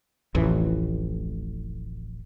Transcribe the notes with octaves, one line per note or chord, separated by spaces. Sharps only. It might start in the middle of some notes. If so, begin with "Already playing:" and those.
D1 A1 F2 E3